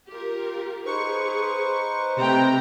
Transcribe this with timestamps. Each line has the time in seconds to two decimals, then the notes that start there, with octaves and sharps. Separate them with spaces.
0.10 F4 G4 A#4
0.86 D#4 G#4 B4 C5 C#6
2.17 C3 A3 G4 G5 A#5